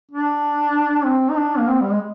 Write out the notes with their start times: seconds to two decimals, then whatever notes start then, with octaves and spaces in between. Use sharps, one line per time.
0.11 D4
1.05 C4
1.30 D#4
1.37 D4
1.58 A#3
1.68 C4
1.81 G3
1.90 G#3